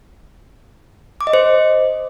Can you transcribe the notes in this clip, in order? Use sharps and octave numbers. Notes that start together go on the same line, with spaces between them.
D6
D#5
C5